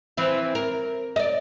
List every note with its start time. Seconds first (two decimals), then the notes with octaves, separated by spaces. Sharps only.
0.17 E3 C4 E4
0.55 A#4
1.16 D5 D#5